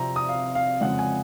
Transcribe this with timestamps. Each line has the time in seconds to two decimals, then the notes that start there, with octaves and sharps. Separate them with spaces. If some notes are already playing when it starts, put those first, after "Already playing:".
Already playing: C3 F3 C4 A#5
0.16 D#6
0.29 F5
0.55 F5
0.81 F2 C#3 G#3 F#5
0.99 G#5